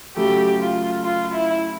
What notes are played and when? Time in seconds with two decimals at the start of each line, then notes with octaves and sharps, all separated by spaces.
0.16 C#3 F#3 A3 G4
0.60 F4
1.04 F4
1.33 E4